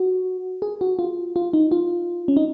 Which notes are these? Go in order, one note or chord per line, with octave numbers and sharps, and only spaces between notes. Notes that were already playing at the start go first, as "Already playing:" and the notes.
Already playing: F#4
G#4
F#4
F4
F4
D#4
F4
C#4
D#4